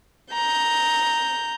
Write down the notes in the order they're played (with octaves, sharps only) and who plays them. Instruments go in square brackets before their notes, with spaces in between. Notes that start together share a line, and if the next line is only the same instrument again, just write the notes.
[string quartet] A#5 G6